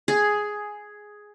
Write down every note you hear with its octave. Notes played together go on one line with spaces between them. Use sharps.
G#4